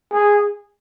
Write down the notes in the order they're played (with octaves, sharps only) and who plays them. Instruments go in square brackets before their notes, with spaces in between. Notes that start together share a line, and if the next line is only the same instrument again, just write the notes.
[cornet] G#4